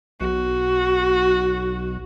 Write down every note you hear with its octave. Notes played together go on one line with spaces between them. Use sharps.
B1 F#4